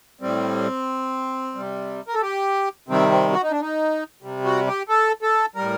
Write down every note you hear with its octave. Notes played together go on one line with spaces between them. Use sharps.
A2 G3 C4
C3 G3
A#4
A4
G4
C3 D#3 G3 C4
C4
F#4
D#4
D4
D#4
C3 G3
F#4
G4
A4
A4
A2 G3 A#4